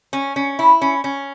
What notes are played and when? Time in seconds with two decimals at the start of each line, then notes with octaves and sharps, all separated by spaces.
0.13 C#4
0.36 C#4
0.59 E4
0.81 C#4
1.04 C#4